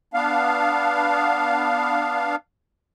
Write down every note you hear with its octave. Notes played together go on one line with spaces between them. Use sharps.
B3 D4 F5